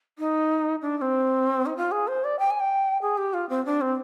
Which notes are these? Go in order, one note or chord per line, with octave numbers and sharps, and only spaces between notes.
D#4
D4
D4
C4
D#4
F4
G#4
C5
D5
G5
G#5
G5
G#4
G4
F4
C4
D4
C4